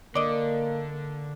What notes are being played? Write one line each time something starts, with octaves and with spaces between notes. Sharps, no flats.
D3 A#3 D5 D#5